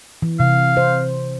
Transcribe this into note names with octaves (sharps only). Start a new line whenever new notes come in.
E3
C3 F5
C5